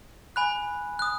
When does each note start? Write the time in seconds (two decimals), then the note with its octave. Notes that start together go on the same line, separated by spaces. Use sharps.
0.36 G#5 B5 F#6
0.99 D#6 F#6